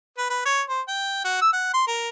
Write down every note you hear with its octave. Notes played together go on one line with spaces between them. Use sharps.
B4
B4
C#5
C5
G5
F#4
E6
F#5
C6
A#4